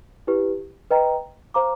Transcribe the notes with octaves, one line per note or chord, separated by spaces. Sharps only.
E4 G4 B4
B4 D#5 G5 A#5
C5 F5 A#5 D6